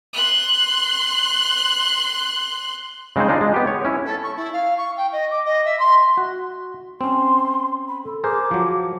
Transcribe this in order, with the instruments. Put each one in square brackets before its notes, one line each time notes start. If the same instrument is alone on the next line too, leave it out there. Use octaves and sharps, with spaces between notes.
[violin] C6 F#6
[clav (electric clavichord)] C#3 G#3 C4 D#4 C5
G#3 D4 D#4 F4
G#3
B3 G4
C#5
C#4 E4
[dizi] A4
C#6
E4
F5
C#6
G5
D#5
D6
D#5
E5
C6
[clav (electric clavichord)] F#4
[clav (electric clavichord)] C4 C#4 [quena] C6
[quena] B5
A4
[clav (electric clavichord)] G#4 A#4 C5 [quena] D6
[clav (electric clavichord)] F3 F#3